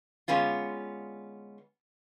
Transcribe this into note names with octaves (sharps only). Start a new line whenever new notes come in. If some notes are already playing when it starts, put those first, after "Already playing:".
D3 G#3 B3 C#4 F4